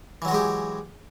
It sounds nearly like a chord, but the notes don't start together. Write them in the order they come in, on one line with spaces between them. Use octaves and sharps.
E3 F#3 F#4 G#3 G4